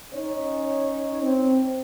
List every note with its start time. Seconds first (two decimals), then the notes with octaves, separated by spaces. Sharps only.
0.14 C#4 D#4 C#5
1.22 C4